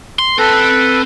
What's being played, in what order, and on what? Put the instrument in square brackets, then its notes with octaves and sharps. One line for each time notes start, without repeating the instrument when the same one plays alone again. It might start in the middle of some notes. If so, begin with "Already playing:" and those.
[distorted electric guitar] C6
[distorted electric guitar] C4 [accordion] A4 B4